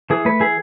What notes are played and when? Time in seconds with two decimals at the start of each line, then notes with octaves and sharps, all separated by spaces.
0.10 E3 G#4
0.25 A3 B4
0.40 E3 G#4